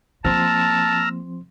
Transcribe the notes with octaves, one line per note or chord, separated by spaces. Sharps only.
F3 A#3 C4 A5 A#5 C6 E6 F6